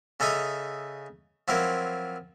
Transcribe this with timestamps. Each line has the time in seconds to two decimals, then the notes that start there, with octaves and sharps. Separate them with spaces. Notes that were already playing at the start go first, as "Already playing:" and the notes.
0.20 C#3 A4 D#5 E5 A#5 D#6
1.48 F3 F#3 C4 E4 A#4